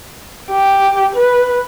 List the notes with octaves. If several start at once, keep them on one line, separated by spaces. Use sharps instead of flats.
G4
B4